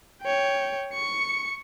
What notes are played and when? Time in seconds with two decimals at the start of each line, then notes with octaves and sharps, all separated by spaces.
0.22 C#5 G5
0.94 C#6 C#7